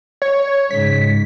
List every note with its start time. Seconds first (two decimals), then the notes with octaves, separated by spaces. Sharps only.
0.22 C#5
0.71 G#2 C#3 B6